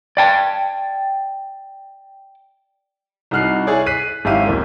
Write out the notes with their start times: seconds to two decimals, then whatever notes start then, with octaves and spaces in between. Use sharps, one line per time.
0.17 D5 G5 A5
3.31 C2 D#4 F#4 F6 F#6 C7
3.67 E4 G#4 C#5 D5
3.86 F#6 B6 C7 D#7
4.25 G#1 F#2 E4 G4 F5 D#7
4.46 D1 F2 A#3